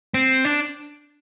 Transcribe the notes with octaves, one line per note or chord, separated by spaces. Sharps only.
C4
D4